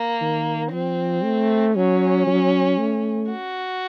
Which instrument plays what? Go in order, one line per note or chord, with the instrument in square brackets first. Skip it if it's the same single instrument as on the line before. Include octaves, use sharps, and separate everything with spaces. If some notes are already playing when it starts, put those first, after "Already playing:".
Already playing: [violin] A#3
[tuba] D#3
[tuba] F3 [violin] C4
[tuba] A3
[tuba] F#3 [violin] C#4
[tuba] F#3
A3
[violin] F#4